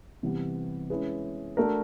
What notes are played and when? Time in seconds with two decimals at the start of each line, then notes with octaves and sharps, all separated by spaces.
0.23 C3 E3 G3 B3
0.90 G#3 C#4 E4 G#4 B4
1.57 A3 D4 F#4 A#4